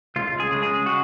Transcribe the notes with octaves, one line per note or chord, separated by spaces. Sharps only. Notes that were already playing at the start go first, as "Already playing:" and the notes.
C#2 F4
G#4
C#3 G#3
G#4
F#4